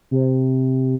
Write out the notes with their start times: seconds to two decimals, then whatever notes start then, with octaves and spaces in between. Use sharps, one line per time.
0.11 C3